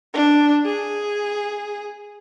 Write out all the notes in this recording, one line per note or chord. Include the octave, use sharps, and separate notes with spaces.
D4
G#4